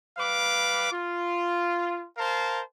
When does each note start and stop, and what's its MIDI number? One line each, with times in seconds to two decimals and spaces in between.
0.17 0.88 55
0.17 0.88 71
0.17 0.88 77
0.17 0.88 86
0.92 2.05 65
2.18 2.61 70
2.18 2.61 72
2.18 2.61 77
2.18 2.61 81